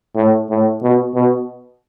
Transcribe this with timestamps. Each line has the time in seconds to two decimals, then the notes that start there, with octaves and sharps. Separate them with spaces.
0.16 A2
0.50 A2
0.83 B2
1.15 B2